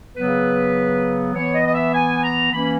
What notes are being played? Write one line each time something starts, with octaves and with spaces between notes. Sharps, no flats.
C#3 F#3 B3 B4
E3 B3 C#5
D#5
D#5
E5
G#5
A#5
E3 A#3 C#4 B5